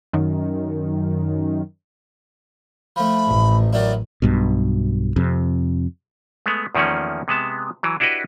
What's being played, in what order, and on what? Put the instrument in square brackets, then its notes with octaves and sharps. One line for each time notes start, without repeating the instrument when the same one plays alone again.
[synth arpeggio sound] F#2 D#3
[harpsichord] F3 A3 [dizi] B5
[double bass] A1
[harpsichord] D#3 F#3 E4 [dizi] D5
[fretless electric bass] B1 G2 B2
F2 C3
[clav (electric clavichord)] G#3 A3 B3
E2 D#3 F3 A3 A#3 C#4
C3 G#3 B3 A5
E3 F#3
D4 E4 F#4 G4 B4 D#5